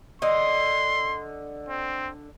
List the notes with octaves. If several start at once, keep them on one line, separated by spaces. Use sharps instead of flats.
D3 D#5 C6
C4